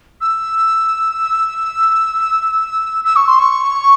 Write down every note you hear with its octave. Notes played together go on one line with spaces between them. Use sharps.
E6
E6
C#6
C6
C#6